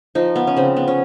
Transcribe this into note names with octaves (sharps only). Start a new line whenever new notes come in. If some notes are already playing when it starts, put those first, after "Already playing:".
F3 D#4
B3
C#4
C#3 C4
B3
C#4